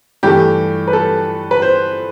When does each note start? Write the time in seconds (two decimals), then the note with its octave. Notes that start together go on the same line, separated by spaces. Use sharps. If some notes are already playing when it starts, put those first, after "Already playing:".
0.23 G2 E3 A3 G4
0.88 B4
0.93 A4
1.51 B4
1.62 C5